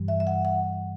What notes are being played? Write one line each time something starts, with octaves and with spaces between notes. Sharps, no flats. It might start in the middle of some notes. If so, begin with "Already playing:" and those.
Already playing: G2 E3 G3
E5
E5
F#5
F#5